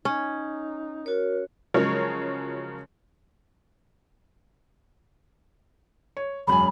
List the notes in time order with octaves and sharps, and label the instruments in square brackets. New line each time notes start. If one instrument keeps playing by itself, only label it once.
[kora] C#4 [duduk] D#4
[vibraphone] F#4 C#5 [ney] A#4
[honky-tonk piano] C#3 F3 F#3 G#3 A#4 C#5
[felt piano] C#5
[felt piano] E1 F#2 G#5 [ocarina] B5